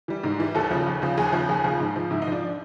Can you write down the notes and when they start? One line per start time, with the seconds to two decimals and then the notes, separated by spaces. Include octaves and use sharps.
0.08 E3 G3
0.24 G#2
0.40 E3 G3
0.55 D#2 A4
0.70 C#3 F3
0.86 D#2
1.02 C#3 F3
1.18 D#2 G#4
1.33 C#3 F3
1.49 D#2 G#4
1.64 C#3 F3
1.80 G#2
1.96 F3
2.11 G#2 E4
2.22 D#4
2.27 F3 D4